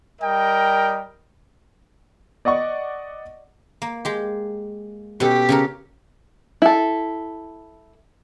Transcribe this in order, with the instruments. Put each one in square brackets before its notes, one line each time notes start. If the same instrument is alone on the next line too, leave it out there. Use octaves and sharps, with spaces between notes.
[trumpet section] G3 A#4 D#5 G5
[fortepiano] D5 D#5 F#5 C#6
[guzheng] A#3
G#3 G4
[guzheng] B2 C#4 A4 [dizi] G4
[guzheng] C#3 A4 A#4
[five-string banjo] E4 A4